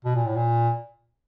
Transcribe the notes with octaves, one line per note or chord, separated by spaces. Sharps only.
B2
A#2
A2
A#2